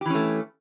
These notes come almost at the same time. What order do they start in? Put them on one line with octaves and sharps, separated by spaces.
G4 E3 C#4 A3